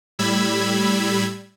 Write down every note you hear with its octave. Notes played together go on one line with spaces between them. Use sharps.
A2 G3 B5 E6 G#6